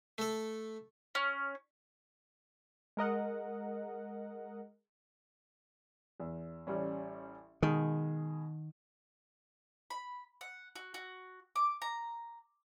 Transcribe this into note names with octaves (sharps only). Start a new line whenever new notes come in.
A3 A4
C#4
G#3 A#4 D#5 F#5
E2
A1 G3 C#4
B2 D#3 G#3 G#4
B5
F#5
F#4
F#4
D6
A#5